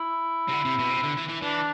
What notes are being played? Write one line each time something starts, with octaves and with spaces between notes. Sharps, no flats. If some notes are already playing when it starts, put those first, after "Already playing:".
Already playing: E4
C3
D3
C3
B2
C3
D3
E3
E3
E3 D4